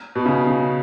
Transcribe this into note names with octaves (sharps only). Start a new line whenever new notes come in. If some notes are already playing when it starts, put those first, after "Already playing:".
B2
C#3
C#3